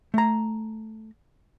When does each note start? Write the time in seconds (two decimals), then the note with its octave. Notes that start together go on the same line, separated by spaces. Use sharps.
0.14 A3 A#5